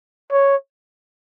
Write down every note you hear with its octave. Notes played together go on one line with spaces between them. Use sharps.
C#5